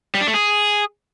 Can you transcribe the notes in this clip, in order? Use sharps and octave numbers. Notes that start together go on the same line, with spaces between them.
G3
D4
A3
G#4